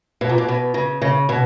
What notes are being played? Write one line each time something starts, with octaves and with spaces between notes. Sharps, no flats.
B2
A#2
B2
B2
C#3
C#3
B2